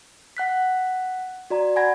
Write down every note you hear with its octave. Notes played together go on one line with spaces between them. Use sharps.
F#5 F#6 B6
F#4 D5 A#5
F#5 G#5 B5 G#6 A#6